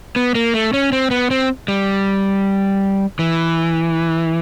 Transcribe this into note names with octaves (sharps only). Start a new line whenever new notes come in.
B3
A#3
A3
C#4
C4
B3
C4
G3
E3